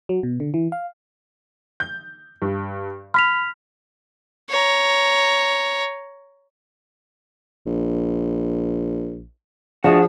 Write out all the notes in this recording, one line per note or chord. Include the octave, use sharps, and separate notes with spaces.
F#3
B2
D3
E3
F5
G6
G2
B5 F6 B6 F7
C#5 A#5
A#1
F3 D4 F#4 G#4